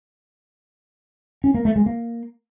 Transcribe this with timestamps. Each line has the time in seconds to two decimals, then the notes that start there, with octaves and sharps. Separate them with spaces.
1.44 C#4
1.54 A#3
1.65 A3
1.76 G#3
1.86 A#3